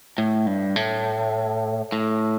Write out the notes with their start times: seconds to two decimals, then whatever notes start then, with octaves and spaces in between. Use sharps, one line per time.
0.18 A2
0.47 G2
0.76 A2
1.92 A2